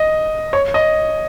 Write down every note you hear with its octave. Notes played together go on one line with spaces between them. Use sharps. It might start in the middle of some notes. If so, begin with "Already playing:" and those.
Already playing: D#5
C#5
D#5